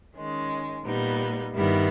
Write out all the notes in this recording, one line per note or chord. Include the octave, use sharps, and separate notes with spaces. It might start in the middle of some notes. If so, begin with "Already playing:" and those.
D#3 G#3 C#4
A#2 G3 B3 D#4
G2 D#3 G3 B3 E4